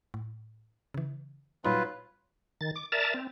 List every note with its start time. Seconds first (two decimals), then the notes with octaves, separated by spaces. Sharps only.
0.14 A2
0.94 C#3 E3
1.65 A#2 F#3 G3 D#4 F4 B4
2.61 D#3 A6
2.76 D6
2.92 A#4 D5 E5 A5 A#5 A6
3.14 C4